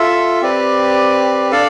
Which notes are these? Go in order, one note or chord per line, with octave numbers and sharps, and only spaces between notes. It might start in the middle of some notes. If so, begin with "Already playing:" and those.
Already playing: F4 A4 E5
C4 G4 B4 D5
D4 A4 D5 F5